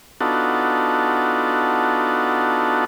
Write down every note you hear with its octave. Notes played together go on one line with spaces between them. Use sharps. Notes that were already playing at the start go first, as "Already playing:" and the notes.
B3 D4 D#4 F4 F#4 A4